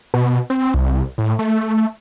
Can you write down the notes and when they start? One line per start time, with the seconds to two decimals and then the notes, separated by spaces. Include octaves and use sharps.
0.14 B2
0.50 C4
0.74 C2
1.18 A2
1.39 A3